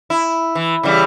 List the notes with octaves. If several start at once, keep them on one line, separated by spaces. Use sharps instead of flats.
E4
E3
C#3 E3 G3